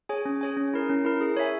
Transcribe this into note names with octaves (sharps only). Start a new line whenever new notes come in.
G#4 C#5 G#5
C#4
G#4 C#5 G#5
C#4
E4 A#4
C#4
E4 A#4
G#4
C#5 E5 G#5